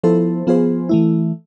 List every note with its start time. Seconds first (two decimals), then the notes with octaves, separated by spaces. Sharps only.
0.03 F3 B3 E4 A4 C5
0.47 F3 B3 F4 G#4 C5
0.89 E3 A3 E4